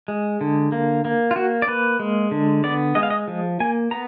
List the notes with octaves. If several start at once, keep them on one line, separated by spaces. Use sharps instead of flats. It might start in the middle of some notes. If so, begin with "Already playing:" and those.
G#3
D3
A#3
A#3
F4
A#3 F#4
D5
A#3 B4
G#3
D3
B3 D5
G#3 D#5
F5
D#5
F3
A#3 G#5
B3 A#5